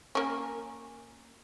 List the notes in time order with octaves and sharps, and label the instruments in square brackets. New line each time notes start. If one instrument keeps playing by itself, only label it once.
[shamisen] A#3 C#4